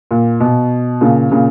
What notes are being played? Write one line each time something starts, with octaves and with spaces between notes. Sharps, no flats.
A#2
B2
A#2 C#3
A#2 C#3